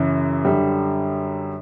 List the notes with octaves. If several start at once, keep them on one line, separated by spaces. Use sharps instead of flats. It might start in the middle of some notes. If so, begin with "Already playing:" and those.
Already playing: F#2 C#3 E3
F#2 D3 G3